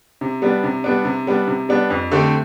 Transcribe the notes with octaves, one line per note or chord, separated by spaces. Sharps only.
C3
G3 B3 D4
C3
G3 B3 D4
C3
G3 B3 D4
C3
G3 B3 D4
F2
D3 A3 C4 G4